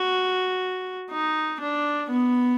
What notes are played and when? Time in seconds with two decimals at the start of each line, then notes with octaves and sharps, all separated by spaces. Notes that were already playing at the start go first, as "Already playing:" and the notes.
Already playing: F#4
1.11 D#4
1.60 D4
2.11 B3